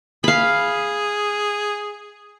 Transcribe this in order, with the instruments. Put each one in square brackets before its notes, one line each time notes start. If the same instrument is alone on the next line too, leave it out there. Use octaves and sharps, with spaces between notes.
[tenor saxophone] G#4 [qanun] F5 B5